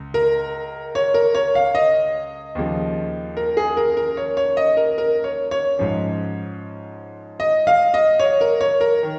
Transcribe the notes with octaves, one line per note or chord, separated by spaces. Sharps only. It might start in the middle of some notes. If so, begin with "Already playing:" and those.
Already playing: C#2
A#4
C#5
A#4
C#5
F5
D#5
D#2 C#3 F3
A#4
G#4
A#4
A#4
C#5
C#5
D#5
A#4
A#4
C#5
C#5
G#2 F3 C#4
D#5
F5
D#5
C#5
A#4
C#5
A#4
D#3